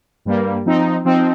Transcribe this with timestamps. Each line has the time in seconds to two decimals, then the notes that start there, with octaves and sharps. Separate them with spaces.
0.25 G2 G3 A#3
0.65 F3 C4 D#4
1.05 F3 C4 D#4